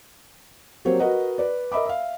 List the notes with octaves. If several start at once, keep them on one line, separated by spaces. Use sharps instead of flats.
F#3 A#3 C4 G4 C5 C#5
F#4 A#4 B4 D#5 F#5
B4 D5
A#4 D#5 E5 B5 D6
E5 F5